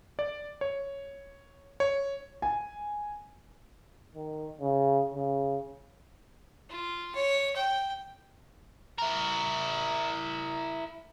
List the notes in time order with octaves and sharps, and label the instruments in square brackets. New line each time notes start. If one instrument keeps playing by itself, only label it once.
[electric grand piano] D5
C#5
C#5
[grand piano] G#5
[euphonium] D#3
C#3
C#3
[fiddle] F4
C#5
G5
[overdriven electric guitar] E4 A#4